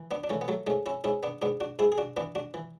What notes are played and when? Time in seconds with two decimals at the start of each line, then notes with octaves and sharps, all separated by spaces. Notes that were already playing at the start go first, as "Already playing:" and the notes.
Already playing: E3
0.11 B3 D4
0.24 D4
0.29 E3 A3 C#4
0.41 B3
0.48 F#3 A3
0.67 G#2 A3 C#4
0.86 C#4 E4
1.04 G#2 C#4 E4
1.23 B3 D4
1.42 G#2 B3 D4
1.60 D4 F#4
1.79 G#2 E4 G#4
1.92 G#4
1.98 D4 F#4
2.17 E3 B3 D4
2.35 D4 F#4
2.54 E3